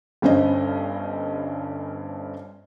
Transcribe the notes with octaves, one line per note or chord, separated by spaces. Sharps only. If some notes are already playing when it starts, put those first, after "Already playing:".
G1 G2 C#4 C5 D#5